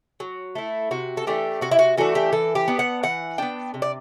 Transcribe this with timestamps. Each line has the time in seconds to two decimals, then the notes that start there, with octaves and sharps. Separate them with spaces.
0.20 F#3
0.55 A3 E4
0.91 C3 F#4
1.17 A4
1.27 E3 A3 D4 G4
1.61 C3 F#4
1.71 E4
1.79 F#4
1.97 E3 A3 D4 F#4
2.15 G4
2.32 E3 A4
2.55 G4
2.68 B3 D4
2.79 F#5
3.03 E3 F#5
3.38 B3 D4 G5
3.74 C3
3.82 D5